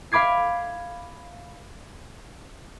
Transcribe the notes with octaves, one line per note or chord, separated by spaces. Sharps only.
F5 B5 D6 G#6 C7